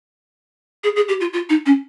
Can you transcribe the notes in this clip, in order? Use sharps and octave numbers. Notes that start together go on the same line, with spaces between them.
G#4
G#4
G4
F4
F4
D#4
C#4